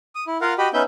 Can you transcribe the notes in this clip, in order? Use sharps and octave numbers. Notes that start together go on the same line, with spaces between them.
D#6
E4
F4 A#4 F5 F#5
F#4 G4 D#5 B5
B3 C#4 D#4 B4 E5 G6